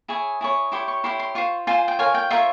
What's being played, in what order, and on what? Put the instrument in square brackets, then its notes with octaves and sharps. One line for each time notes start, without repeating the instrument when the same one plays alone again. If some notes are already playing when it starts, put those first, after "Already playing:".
[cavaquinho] E4 G#4 C#5 G#5
E4 G#4 C#5
E4 G4 C#5 C6
C#6
E4 G4 C#5 C6
C6
F4 C5 C#6
F4 C5 G#5
G#5
G5
F4 A#4 C#5 G#5
G5
F4 A#4 C#5 E5